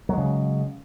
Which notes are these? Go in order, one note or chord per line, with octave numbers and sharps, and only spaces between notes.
C#3 F#3 G#3